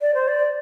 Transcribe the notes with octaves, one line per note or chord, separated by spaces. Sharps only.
D5
C5
D5